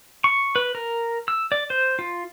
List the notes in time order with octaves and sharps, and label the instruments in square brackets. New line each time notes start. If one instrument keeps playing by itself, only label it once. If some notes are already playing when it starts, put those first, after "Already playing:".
[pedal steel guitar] C#6
B4
A#4
E6
D5
C5
F4